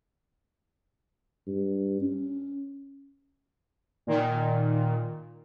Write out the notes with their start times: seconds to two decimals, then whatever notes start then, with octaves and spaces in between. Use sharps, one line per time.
1.47 G2
2.02 C#4
4.07 A#2 D#3